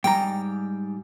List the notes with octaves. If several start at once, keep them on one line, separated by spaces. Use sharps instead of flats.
G#2 G3 G5 A#5